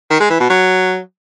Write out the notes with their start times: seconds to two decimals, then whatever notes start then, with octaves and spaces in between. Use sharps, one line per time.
0.10 D#3
0.20 G#3
0.30 E3
0.40 B2
0.50 F#3